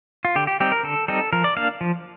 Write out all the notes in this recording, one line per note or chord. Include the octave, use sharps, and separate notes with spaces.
F4
D3 G4
G4
G3 C4 D#4 G4
A#4
D3 A4
G3 C4 D#4 A4
F3 A#4
D5
A#3 D4 F5
F3